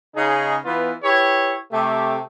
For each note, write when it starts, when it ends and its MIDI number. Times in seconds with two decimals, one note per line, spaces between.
0.15 0.55 49
0.15 0.55 63
0.15 0.55 68
0.65 0.93 52
0.65 0.93 59
0.65 0.93 65
1.03 1.57 64
1.03 1.57 67
1.03 1.57 71
1.03 1.57 73
1.72 2.19 48
1.72 2.19 57
1.72 2.19 67